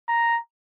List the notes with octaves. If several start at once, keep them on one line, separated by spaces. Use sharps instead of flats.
A#5